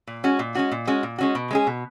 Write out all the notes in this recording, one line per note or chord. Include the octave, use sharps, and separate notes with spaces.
A#2
G#3 C#4 F#4
A#2
G#3 C#4 F#4
A#2
G#3 C#4 F#4
A#2
G#3 C#4 F#4
B2
G#3 C#4 G#4
B2